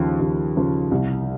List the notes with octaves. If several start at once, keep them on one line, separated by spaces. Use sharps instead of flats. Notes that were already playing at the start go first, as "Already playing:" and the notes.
Already playing: D#2 C#3 F3
D#2
C#3 F3
C2